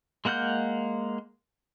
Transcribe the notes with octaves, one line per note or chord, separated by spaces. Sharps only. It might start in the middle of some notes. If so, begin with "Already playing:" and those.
G#3 A#3 F#5 F6 G6